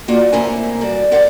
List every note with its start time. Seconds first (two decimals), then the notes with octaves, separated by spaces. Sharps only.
0.08 A#3 F4 F#4 D5
0.32 A2 C3 A#3 E4 A#4 G#5
0.81 G2 F#4 D5
1.11 G4 A#4 C5 D5 F#5